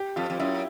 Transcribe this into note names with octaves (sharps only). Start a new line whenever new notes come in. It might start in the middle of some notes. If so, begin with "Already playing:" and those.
Already playing: G4
F2 F4
F2
F#2 E4